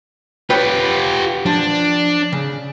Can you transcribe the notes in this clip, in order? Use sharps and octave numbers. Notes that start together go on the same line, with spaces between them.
F4 G4 B4 C#5 G5
F3 D4
C#3